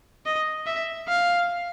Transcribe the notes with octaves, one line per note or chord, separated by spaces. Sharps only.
D#5
E5
F5